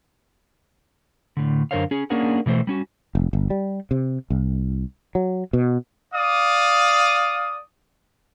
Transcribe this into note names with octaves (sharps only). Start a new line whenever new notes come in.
A2 D3
F#2 D3 A#4 C5 C#5 F5
C#4 G#4
A#3 C#4 D4 G#4 A#4 F#5
B2 E3 A3 C5
G3 C#4 F#4
F1
G1
G3
C3
C2
F#3
B2
D5 F5 D#6